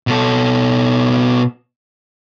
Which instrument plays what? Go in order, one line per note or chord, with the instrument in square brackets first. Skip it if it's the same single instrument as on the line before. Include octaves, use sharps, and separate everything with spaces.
[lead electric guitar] B2 A4